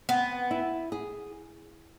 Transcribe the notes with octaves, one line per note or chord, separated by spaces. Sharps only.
B3 C4
E4
G#4